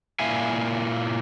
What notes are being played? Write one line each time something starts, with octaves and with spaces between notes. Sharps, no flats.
A#2 A#3 E4 E5 F5 G#5